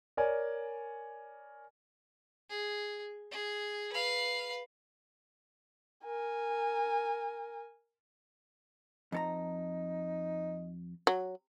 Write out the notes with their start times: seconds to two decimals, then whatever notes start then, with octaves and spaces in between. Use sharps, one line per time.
0.17 A#4 C#5 D5 G#5
2.50 G#4
3.31 G#4
3.92 B4 F5
6.06 A#4 G#5
9.12 F2 D#4 A4 A#5
11.07 F#3